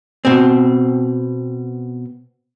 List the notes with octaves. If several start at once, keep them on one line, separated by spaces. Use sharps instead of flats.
B2 C4